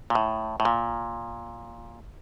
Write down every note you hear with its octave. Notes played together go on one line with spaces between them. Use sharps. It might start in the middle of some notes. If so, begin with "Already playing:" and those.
A#2
A2
A2
A#2